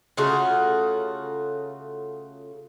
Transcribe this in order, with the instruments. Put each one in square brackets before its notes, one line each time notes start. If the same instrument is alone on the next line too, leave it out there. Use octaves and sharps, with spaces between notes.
[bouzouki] C#3 A3 F4 F#4